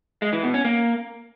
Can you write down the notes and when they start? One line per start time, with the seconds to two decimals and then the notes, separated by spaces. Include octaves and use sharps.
0.22 G#3
0.33 E3
0.43 B2
0.54 C#4
0.65 A#3